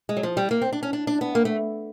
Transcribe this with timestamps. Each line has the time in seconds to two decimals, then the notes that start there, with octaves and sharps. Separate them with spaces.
0.09 G#3
0.17 F#3
0.23 F3
0.37 G3
0.51 A#3
0.61 C4
0.73 D4
0.83 C#4
0.93 D4
1.07 D4
1.21 B3
1.35 A#3
1.45 A3